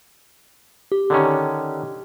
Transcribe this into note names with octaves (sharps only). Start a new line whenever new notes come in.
G4
D3 D#3 C#4